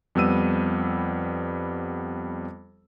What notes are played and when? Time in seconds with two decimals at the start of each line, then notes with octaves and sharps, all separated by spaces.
0.15 F2 G3 B3 E6 D#7